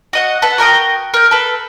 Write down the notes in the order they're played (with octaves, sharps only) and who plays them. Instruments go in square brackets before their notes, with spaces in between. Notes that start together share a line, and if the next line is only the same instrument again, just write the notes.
[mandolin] F#4 D#5 F#5
A4 B4 F#5 A5
F#4 A#4 G5 D#6
A#4 G6
A4 B4